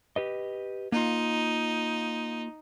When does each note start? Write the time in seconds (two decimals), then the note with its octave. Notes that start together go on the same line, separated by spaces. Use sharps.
0.16 G4 B4 D#5
0.92 A#3 D#4 F4